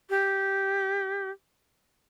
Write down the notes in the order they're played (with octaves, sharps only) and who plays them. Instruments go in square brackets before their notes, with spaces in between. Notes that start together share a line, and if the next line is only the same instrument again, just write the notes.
[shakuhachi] G4